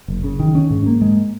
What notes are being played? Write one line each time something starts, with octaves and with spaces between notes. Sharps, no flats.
F#1
C#3
D#3
C#4
G#2
A#3
G#3